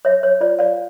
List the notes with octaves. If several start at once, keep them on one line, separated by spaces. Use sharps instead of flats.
C#5 E5
C#5
F4 D5
D5 F5